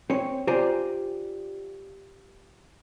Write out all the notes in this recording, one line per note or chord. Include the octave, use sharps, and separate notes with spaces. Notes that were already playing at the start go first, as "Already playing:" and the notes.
C4 C#5
F4 G4 C5 D5 G#5 A#5